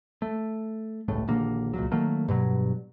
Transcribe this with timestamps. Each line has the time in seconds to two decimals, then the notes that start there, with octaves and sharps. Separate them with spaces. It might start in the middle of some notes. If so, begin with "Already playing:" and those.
0.22 A3
1.08 G1 C#2 A2 A3
1.28 A#1 D#2 D3 A#3
1.74 C#2 A#2 F#3
1.92 D#3 F#3 A3 A#3
2.28 G2 B2 F#3